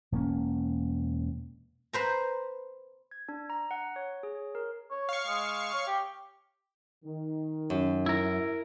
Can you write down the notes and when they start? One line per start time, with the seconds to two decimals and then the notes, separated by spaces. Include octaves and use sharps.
0.12 E1 G2 A#3 C#4
1.93 B4 C5 A#5
3.11 G#6
3.29 D4
3.50 A#5
3.71 F#5
3.96 C#5
4.23 G#4
4.35 C#5
4.55 A#4
4.91 C#5
5.09 F5 C#6
5.27 G#3
5.73 C#5
5.87 G4
7.04 D#3
7.70 F#2
8.06 E4 A#4